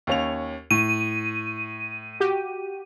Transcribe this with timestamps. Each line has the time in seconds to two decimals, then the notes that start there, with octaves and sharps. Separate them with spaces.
0.07 D#2 C#4 F7
0.71 A2 D#7
2.20 F#4 G4